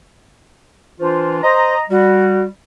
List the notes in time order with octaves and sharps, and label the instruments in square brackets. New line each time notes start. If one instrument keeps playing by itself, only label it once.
[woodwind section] E3 D4 F4 [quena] C5
[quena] C5 [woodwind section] D#5 A#5
[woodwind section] G3 [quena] F#4